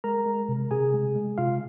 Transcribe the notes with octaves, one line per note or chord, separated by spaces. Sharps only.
G#3 A#4 A#5
G#3
C3
C3 G#4 G#5
G#3
G#3
C3 F4 F5